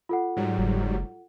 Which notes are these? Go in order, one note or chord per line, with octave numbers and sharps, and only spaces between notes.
F4 A4 F#5
G#2 F#3 G3
F#1